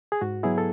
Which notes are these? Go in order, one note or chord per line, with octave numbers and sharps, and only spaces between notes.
G#4
G#2 F#4
F#3 B3 E4 G#4
A4